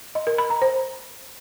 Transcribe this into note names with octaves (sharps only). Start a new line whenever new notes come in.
D#5
A#4
B5
A#5
C5